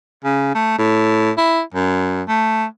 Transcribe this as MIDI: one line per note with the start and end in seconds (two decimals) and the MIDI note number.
0.24 0.53 49
0.55 0.76 57
0.78 1.31 45
1.37 1.62 64
1.74 2.22 42
2.28 2.65 57